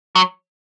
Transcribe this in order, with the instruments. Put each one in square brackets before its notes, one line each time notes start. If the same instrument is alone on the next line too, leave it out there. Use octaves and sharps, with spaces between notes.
[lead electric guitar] F#3